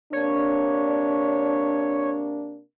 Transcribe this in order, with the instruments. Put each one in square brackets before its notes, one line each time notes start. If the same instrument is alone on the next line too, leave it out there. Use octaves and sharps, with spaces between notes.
[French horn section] C3 A#3 D4 [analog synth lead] C#5